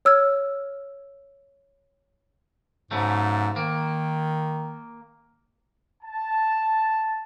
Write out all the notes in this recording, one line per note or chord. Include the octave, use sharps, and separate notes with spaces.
C#5 E6 F6 G#6
G#2 C#3 F#3 A3
D#3 A#3
A5